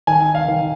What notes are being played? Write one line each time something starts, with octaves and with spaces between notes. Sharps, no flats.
D#3 G#5
F5
D#3